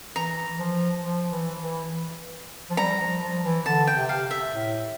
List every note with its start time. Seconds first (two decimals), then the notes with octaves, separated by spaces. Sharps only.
0.16 E3 A#5
0.59 F3
1.03 F3
1.32 E3
1.62 E3
2.70 F3
2.77 G3 A#5
3.00 F3
3.22 F3
3.44 E3
3.65 D3 A5
3.87 G5
3.95 C3
4.09 F5
4.31 E5
4.52 A2